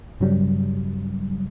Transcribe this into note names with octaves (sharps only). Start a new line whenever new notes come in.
G2 C#3 F#3 G3